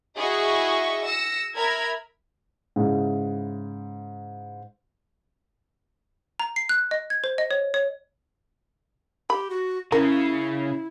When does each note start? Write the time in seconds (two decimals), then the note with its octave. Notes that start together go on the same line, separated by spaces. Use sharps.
0.16 E4 F#4 G#4 D#5 E5 C#6
1.05 E6 A#6 C#7
1.55 A#4 E5 A#5 B5 G#6
2.76 G#2 C#3 G#3 E4
6.40 A#5
6.56 C7
6.69 F#6
6.91 D#5
7.10 G#6
7.24 C5
7.38 D#5
7.51 C#5
7.74 C#5
9.30 G4 B5
9.50 F#4
9.92 C#3 E4 A#4